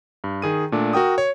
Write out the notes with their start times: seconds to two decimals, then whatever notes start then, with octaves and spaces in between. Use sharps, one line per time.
0.24 G2
0.42 D#3 G#4 D#7
0.72 A#2 A3 D4
0.93 F#4 A#4 G5 D#6
1.18 C#5